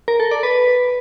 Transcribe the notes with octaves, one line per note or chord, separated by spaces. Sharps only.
A#4
A4
D5
B4